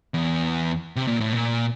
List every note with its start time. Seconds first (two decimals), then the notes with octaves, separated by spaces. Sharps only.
0.14 E2
0.96 C3
1.08 A#2
1.20 A2
1.33 A#2